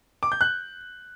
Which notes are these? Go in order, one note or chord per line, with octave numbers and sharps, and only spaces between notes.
D6
G6
F#6